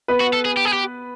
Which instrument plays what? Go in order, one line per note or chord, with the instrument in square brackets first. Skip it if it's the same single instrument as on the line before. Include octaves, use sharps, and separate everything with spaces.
[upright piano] B3 B4
[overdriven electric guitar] F#4
A4
G#4
G4
G#4
G4